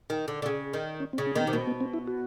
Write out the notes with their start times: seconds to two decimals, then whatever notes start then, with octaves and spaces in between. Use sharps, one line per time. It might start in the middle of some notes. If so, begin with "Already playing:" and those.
0.10 D#3
0.28 D3
0.42 D3
0.46 C#3
0.73 D#3
1.00 C#4
1.13 C4
1.18 C#3
1.27 C#4
1.36 D#3 A#3
1.40 B3
1.47 C3
1.53 B2 A#3
1.67 B3
1.80 C4
1.94 E4
2.07 F#4